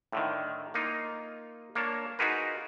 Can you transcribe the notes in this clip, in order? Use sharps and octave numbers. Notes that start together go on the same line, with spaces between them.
A2 D3 D#3
A#3 D#4 F4
A#3 D4 C#5 A5
D#4 F4 F#4 G#4 A#4 B4